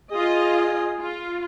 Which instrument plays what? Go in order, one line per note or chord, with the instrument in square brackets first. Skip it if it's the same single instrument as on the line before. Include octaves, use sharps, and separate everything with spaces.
[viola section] F4 D#5 [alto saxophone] G#4
[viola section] F4